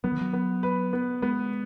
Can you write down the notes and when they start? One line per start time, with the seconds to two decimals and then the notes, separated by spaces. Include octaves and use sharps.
0.04 F#3 B3
0.12 D#3
0.21 F#3
0.33 B3
0.63 B4
0.93 B3
1.22 G#3 B3